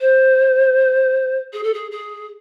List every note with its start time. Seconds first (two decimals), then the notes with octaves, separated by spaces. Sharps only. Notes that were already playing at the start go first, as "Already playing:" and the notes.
0.01 C5
1.53 G#4
1.64 A4
1.74 G#4
1.91 G#4